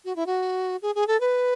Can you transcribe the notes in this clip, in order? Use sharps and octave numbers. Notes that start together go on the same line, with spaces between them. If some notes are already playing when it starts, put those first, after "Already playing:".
F#4
E4
F#4
G#4
G#4
A4
B4